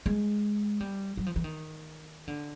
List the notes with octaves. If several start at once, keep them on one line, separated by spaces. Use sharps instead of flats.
G#3
G3
F#3
F3
E3
D#3
D3